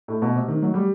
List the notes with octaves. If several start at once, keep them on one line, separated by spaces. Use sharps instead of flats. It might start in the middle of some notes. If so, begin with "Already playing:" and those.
A2
B2
C3
D#3
F#3
G3